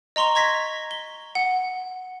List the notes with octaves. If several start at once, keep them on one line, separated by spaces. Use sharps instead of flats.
D#5 A#5 C6 C#6 F7
C#6 G#6 A#6 B6
G7
F#5